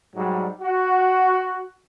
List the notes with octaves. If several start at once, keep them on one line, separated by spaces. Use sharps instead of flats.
G#2 F#3 G3
F#4